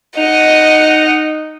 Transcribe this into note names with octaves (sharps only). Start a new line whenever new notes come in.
D#4 D#5 F#5